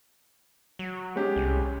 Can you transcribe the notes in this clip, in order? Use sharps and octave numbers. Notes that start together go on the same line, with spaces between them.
F#3
G#3 C#4 G4
C2